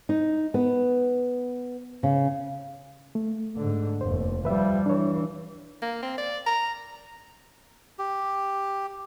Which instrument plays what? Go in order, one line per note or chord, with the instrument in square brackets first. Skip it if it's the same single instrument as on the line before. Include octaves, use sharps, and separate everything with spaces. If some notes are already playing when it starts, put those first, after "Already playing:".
[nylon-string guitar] D#4
B3
C#3
[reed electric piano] A3
[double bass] G#2 D3
[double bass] F1 D#2 [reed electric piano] C5
[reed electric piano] D#2 B4 E5 [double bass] F3 G3
[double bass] E3 [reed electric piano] D4 C#5
[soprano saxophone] A#3
C4
D5
A#5
[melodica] G4